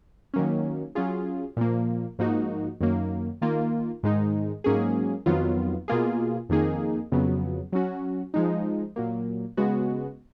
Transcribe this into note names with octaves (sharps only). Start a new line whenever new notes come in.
D#3 F#3 A#3 C#4
F#3 C#4 F4 G#4
A#2 F3 A#3
G#2 F3 A#3 D#4 F#4
F#2 D#3 F#3 A#3
D#3 A#3 F4
G#2 D#3 G#3 D#4
G#2 F#3 A#3 C#4 G#4
F2 D#3 F#3 B3 F4
B2 A#3 F4 G#4
F2 D#3 A#3 D#4 G#4
F2 C#3 F#3 B3
F#3 C#4 F#4
F3 G#3 D#4
A#2 F#3 A#3
C#3 G#3 B3 F#4